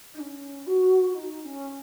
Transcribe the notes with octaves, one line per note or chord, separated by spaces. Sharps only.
D#4
C#4
F#4
D#4
C#4